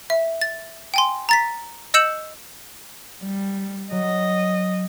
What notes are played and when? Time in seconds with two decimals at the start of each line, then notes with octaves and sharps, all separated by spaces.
0.10 E5
0.41 A6
0.94 G5 G#5 C6
1.29 A#5 A6 B6
1.94 D#5 E6 G6 C#7 E7 F#7
3.23 G3
3.92 F#3 D#5